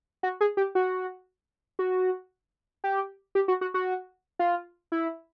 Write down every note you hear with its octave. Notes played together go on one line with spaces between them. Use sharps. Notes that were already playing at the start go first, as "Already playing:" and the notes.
F#4
G#4
G4
F#4
F#4
G4
G4
F#4
F#4
F#4
F4
E4